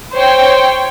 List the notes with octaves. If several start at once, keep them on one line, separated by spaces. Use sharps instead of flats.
C5 C#5 G5